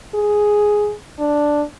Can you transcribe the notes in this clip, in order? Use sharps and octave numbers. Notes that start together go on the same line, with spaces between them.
G#4
D4